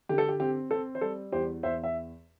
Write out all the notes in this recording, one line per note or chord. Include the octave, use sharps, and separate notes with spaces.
D3 G4
A4
G4
C4 G4
C4 A4
C5
G3 A4
E2 G4 C5
E2 C5 E5
E5